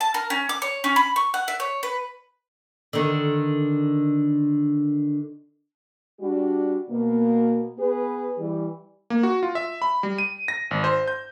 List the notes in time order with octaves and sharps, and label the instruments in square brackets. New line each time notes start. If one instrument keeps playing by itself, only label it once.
[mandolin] A5
A#4
C#4
D6
C#5
C#4
B5
C#6
F#5
E5
C#5
B4
[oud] D3 D#3
[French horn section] G3 D4 F#4
B2 A#3
B3 G#4 B4
E3 G3
[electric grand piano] A#3
F#4
F4
E5
B5
G3
D#7
A#6
G#1
C5
G6